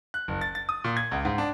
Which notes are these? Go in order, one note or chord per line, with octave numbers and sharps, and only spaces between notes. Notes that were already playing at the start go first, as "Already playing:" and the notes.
F#6
F#1
A6
A6
D#6
A#2
G#6
C#2
G#2
D4